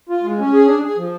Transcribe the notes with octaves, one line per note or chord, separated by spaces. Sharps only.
F4
G#3
C#4
G#4
D4
G#4
F3